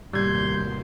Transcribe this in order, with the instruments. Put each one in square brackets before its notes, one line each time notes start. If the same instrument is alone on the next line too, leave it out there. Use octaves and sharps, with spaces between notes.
[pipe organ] D#2 C6 G6 [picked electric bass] A2 C3 A#3 [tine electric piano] G3 G#6